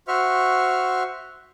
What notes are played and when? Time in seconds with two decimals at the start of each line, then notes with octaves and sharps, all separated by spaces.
0.08 F#4 C5 E5 C#6 F6